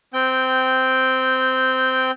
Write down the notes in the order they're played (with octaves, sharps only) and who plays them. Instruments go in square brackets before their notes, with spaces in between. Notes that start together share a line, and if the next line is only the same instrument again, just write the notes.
[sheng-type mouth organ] C4 G5 G6